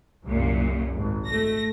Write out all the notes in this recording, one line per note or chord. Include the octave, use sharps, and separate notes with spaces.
C2 F#2 A#2
G#1
A3 A#6